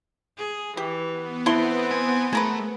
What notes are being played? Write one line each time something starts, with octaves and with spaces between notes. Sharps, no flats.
G#4
E3 G4
B3
C4 E4 A4 C6
G#5
A3 G#4 A#4 B4